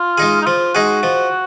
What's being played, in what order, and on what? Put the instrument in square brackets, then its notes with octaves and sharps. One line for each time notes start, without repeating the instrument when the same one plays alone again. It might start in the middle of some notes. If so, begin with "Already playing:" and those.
Already playing: [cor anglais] F4
[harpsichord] G#3 D#4 G#4
[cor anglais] D#4
[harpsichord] F3 [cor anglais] F4
[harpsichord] G#3 D#4 G#4 [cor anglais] F#4
[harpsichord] F3